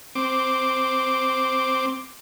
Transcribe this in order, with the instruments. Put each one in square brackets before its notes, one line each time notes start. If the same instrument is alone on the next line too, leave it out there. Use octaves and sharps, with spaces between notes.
[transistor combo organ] C4 D6